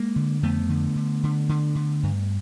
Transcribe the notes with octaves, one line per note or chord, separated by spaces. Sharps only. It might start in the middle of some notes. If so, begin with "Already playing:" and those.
Already playing: G#3 A#3
D3
F2 A3 B3
D3
D3
D3
D3
D3
G2